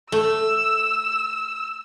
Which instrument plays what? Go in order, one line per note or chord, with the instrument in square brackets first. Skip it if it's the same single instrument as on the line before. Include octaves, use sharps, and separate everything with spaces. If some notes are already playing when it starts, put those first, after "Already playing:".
[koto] A3 [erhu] E6